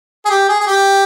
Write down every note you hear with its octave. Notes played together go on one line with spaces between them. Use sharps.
G#4
G4
G#4
G#4
G4